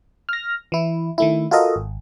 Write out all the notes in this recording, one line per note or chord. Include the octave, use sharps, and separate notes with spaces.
F6 A#6
E3 E4
D#3 A3 E4
F4 F#4 A4 A#4 D#5
G#1